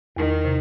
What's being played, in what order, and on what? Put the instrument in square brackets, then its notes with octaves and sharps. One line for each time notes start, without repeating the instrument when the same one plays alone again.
[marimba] E2 [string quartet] D#3
[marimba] C3